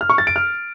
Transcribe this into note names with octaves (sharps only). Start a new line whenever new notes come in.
F6
C#6
A6
D7
F6